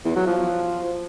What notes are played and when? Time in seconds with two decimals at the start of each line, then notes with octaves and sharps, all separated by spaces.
0.05 E2
0.16 F#3
0.27 F3